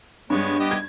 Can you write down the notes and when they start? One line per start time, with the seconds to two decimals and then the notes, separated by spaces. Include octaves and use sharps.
0.30 G2 G#3 B3 C#5
0.59 B3 G4 D#5
0.71 G#6